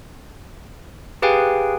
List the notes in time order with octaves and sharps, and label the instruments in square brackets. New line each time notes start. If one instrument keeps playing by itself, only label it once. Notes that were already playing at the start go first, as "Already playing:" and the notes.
[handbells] G4 G#4 B4 F5 G5 G#5